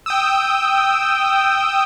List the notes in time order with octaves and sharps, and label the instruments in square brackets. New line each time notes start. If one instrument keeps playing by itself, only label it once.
[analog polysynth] G5 D#6 E6